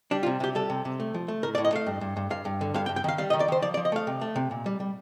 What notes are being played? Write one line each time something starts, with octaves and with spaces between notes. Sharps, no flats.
G3 D4
F4
C3
C3 G4
G3 A4
C3
C3
A3
F3
A3
A2 A#4
D5
A2
D#5
A3 F5
G2
G2
G2
G2 F5
G2
D3
G2 F5
G5
G2
G5
D#3 F5
G3 F5
D#5
D#3
D5
D#3 C5
F3 D5
D5
F3
D#5
A3 F5
C3
A3
C3
A#2
G3
G3